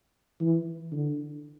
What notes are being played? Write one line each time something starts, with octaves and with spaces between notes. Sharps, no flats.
E3
D3